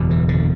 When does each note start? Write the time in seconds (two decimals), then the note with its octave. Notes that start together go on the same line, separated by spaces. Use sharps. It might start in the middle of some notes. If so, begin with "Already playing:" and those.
Already playing: F#1 E2 B2
0.11 E3
0.29 D3